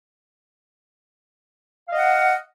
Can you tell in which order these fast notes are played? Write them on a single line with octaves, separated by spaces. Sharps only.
F5 D#5 F#5